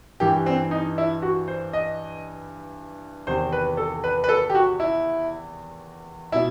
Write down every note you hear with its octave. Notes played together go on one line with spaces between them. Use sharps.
G2 E3 G4
C4
D#4
E4
F#4
C5
D#5
E2 C3 D#3 C5
B4
A4
B4
B4
A4
G4
F#4
E4
B2 E4